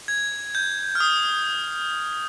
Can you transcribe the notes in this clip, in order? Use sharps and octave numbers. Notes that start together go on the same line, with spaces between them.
G#6
G6
F6
D#6